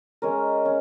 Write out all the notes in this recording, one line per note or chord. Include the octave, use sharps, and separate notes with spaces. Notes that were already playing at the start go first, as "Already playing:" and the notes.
G#3 C#4 A#4
C#4